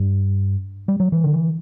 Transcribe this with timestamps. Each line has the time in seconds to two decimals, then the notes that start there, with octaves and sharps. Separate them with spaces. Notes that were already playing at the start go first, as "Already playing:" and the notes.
Already playing: G2
0.88 G3
1.00 F#3
1.12 E3
1.24 D3
1.33 E3